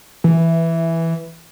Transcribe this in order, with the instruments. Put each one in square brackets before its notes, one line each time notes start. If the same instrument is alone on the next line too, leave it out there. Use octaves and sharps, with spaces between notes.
[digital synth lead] E3